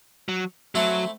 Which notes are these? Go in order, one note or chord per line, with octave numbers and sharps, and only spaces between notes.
F#3
F#3 A3 C4 E4 A4